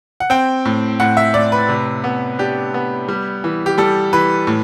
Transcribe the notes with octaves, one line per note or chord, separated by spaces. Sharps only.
F#5
C4 G5
A2
A2 F#5
E5
A2 D5
B4
C3
B3
D4 G4
B3
G3
E3
G4
G3 A4
E3 B4
A2